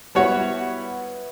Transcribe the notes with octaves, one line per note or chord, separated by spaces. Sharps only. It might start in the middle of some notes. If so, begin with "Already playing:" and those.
G3 B3 E4 F#4 C#5 F#5